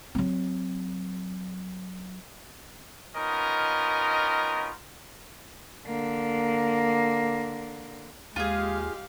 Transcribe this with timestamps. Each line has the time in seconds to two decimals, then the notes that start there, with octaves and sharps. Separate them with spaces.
0.15 F#3 C4
3.16 B3 C#4 D#4 F4 A#4 D#5
5.86 D3 A#3
8.36 D#2 G#3 F4 G4 G#4 F5